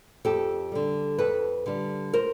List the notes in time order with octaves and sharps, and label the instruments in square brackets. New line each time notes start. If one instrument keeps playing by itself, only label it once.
[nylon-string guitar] F2 G4 A4
D3 G3
F2 A4 B4
D3 G3
A#4 C5